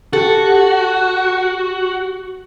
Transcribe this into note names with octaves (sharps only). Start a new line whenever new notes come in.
F#4 G4 A4